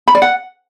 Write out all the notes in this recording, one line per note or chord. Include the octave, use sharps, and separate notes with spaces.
B5
D5
F#5